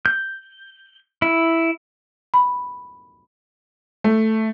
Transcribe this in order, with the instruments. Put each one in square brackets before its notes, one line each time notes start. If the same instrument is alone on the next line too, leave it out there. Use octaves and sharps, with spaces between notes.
[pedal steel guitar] G6
E4
[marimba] B5
[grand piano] A3